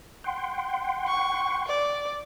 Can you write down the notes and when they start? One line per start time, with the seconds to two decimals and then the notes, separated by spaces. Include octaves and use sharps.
0.24 F#5 G5 C6
1.07 C#6
1.67 D5